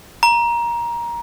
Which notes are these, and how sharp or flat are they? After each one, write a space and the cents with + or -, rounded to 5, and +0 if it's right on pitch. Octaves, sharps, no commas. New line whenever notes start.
A#5 +15